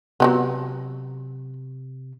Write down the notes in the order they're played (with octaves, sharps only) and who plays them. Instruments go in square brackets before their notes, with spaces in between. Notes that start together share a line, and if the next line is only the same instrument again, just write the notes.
[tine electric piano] C3 [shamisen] F#3 G3 B3